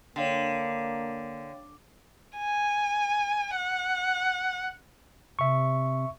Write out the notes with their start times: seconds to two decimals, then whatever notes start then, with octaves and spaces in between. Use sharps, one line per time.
0.16 D3 A#3 C#5 F5 G5
2.37 G#5
3.55 F#5
5.39 C3 E5 C#6